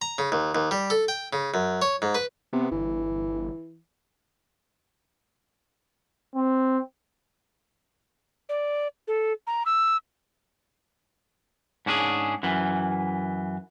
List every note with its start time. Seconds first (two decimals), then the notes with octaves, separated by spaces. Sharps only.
0.02 A#5
0.18 C#3
0.32 D#2
0.55 D#2
0.71 G3
0.90 A4
1.08 G5
1.33 C#3
1.54 F#2
1.82 C#5
2.02 G#2
2.15 B4
2.53 C3 B3
2.71 G1 E3
6.35 C4
8.49 D5
9.08 A4
9.47 A#5
9.66 E6
11.86 G#2 C#4 D4 E4 G#4
12.43 F#2 E3